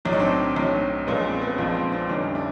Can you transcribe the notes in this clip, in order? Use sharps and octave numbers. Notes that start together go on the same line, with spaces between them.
B1 A2 F#3 D4
D#4
C4 D4
B1 A2 F#3
A#1 A#2 F3 G#3 B3 C#4
C4
B3
A#1 A#2 F3 G#3 C4
C4
C4 D4
F1 F2 D3 G3 C#4 D#4
D4 E4